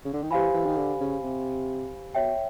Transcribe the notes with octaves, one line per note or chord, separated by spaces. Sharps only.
C#3
D3
D#3
E3 G4 C5 F5 G#5 B5
E3
D#3
D3
C#3
C3
B2 C#5 E5 G5